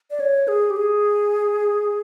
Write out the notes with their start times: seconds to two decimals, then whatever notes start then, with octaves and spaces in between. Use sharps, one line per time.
0.11 D5
0.20 C#5
0.48 G#4
0.70 G4
0.76 G#4